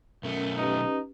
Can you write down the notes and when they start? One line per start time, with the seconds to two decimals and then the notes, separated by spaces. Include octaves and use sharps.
0.23 B1 A3 C#4 A#4
0.58 C#4 D#4 G4 B4